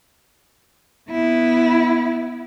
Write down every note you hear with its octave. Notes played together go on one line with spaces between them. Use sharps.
B3 E4